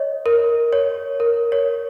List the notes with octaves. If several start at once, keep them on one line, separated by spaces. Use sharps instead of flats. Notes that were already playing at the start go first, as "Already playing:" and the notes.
Already playing: C#5 D#5
A#4
C#5
A#4
C#5